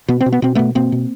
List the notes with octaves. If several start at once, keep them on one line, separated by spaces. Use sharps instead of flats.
B2 B3
C4
B2
B3
B2 C4
B2 A3 B3
B2 A#3 C4
B2